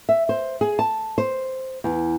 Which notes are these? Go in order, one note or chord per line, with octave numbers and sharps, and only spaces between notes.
E5
C5
G#4
A5
C5
E2